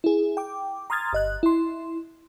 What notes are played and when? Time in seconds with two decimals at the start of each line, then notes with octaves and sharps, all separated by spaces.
0.04 E4 G#4
0.37 G5 D6
0.90 A#5 C6 D#6 F6 G#6 A6
1.13 G1 D#5 F#6
1.43 E4 C6